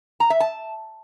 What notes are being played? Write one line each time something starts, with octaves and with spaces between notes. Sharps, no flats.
A#5
E5
A5